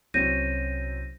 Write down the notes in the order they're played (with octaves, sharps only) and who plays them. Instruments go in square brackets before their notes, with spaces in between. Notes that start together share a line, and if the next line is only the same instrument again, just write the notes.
[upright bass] C2 [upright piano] F#3 C4 C#4 [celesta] G6 A#6 D#7